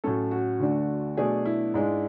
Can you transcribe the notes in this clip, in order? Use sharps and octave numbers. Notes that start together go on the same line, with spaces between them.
A2 F#3 C#4 A4
F#4
D2 D3 A3 D4
B2 F#3 A3 D4 G#4
E4
G#2 G#3 D4